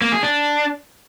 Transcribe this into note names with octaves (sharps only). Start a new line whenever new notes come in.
A#3
G#4
D4